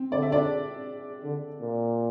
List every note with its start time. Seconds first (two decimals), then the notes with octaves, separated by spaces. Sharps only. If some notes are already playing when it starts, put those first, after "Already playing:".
Already playing: C4
0.12 D3 D5
0.22 E5
0.32 D4 D5
1.23 D3
1.61 A#2